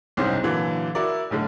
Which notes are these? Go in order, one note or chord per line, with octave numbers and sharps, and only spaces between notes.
F#1 C2 G#2 C3 C#4 C5
A#2 D3 E3 F#3
E4 F#4 A#4 D5
B1 A2 D3